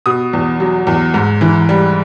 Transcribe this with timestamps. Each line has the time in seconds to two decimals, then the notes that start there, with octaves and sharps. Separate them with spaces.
0.06 B2 D#6
0.33 E2
0.60 F#3
0.87 E2
1.14 G#2
1.41 E3
1.69 G3